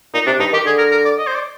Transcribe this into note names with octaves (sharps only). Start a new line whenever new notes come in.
A#2 D#4
C3 D4
G2 D#4
D#3 G4
D3 G#4
A#4
A#4
D5
D#5
C5
D5